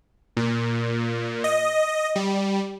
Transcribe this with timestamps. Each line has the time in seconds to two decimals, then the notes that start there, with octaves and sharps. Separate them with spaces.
0.37 A#2
1.44 D#5
2.16 G3